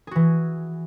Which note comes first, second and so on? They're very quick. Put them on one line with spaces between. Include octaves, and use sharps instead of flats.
G#4 F#4 E3